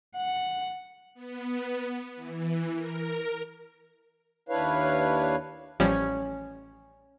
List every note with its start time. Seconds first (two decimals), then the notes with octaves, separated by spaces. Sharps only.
0.16 F#5
1.14 B3
2.15 E3
2.73 A#4
4.49 D#2 D4 E4 B4 C#5 F5
5.80 A1 F3 G3 C#4